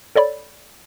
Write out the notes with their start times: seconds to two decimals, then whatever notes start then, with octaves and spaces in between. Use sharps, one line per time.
0.15 A4 C#5 D5 B5